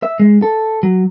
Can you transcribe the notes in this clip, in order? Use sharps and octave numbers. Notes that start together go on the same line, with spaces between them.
E5
G#3
A4
F#3